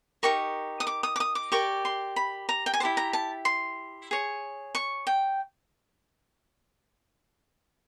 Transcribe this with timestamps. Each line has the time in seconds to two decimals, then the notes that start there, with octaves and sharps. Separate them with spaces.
0.23 D#4 G4 A#4 C#6
0.80 D#6
0.87 D6
1.03 D#6
1.16 D6
1.20 D#6
1.35 D6
1.52 G4 A#4 D5 C#6
1.85 C6
2.16 B5
2.49 A#5
2.66 G5
2.74 G#5
2.80 E4 G4 C5 A5
2.97 A#5
3.13 A5
3.45 C6
4.11 G#4 C#5
4.75 C#6
5.07 G5